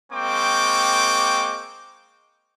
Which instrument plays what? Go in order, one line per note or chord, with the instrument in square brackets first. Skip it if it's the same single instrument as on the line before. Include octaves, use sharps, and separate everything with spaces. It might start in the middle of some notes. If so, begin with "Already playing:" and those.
[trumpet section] G#3 A#3 C4 G5 C#6 D6